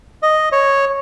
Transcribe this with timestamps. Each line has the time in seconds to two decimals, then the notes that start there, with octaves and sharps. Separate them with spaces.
0.23 D#5
0.52 C#5